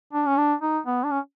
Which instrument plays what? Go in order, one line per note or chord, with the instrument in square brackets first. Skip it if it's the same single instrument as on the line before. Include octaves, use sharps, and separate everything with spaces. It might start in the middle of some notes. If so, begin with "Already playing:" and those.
[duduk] D4
C#4
D4
D#4
B3
D4
C#4